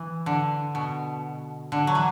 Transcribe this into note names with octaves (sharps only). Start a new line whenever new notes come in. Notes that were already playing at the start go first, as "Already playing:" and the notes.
Already playing: E3
D3
B2
D3
F#3
E3